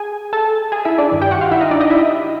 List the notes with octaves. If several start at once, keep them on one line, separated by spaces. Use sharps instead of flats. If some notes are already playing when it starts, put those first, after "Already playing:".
Already playing: G#4 G#5
A4 A5
G#4 G#5
E4 E5
D4 D5
G2 D#3
G4 G5
F#4 F#5
F4 F5
E4 E5
D#4 D#5
D4 D5
D#4 D#5
E4 E5